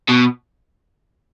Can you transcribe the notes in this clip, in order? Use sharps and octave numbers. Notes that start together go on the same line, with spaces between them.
B2